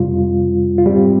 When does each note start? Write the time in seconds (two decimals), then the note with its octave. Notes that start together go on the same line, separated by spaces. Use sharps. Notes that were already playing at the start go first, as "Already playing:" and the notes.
Already playing: F2 C3 G3 F4
0.78 F4
0.86 G#2 G3 C4 G4